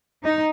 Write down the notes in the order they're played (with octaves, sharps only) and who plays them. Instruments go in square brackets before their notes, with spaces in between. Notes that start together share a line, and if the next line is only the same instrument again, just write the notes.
[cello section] D#4